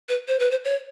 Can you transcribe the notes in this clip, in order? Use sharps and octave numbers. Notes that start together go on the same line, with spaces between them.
B4
C5
B4
C5
C#5